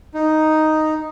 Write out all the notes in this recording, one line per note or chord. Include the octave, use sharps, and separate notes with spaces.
D#4